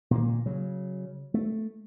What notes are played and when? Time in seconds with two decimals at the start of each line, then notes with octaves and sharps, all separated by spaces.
0.11 A#2 D#3 A#3
0.46 C#3 F#3
1.34 A3